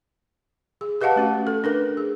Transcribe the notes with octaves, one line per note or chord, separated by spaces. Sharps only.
G#4
G4 B4 D#5 F5 F#5 A5
A3 C#4 F#4
A4
D4 A#4 B4
G#4